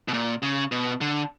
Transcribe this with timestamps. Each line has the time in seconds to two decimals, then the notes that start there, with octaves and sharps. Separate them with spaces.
0.08 B2
0.13 A#2
0.42 C#3
0.72 B2
1.01 D3